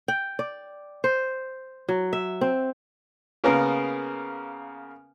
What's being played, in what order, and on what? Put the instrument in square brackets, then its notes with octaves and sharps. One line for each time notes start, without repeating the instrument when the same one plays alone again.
[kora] G5
D5
C5
F#3
E5
C4
[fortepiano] C#3 A#3 B3 A#4